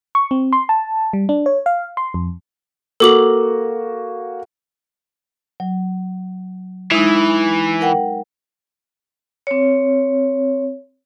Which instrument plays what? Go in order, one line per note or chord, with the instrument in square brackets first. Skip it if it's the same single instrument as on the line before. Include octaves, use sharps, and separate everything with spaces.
[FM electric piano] C#6
C4
C6
A5
G3
D4
C#5
F5
C6
F2
[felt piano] A#3 F#4 [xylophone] A4 D6 F#7
[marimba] F#3
[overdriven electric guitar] E3 [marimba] G#3 D#4
[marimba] A#4 F#5 G5
[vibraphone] C4 C#5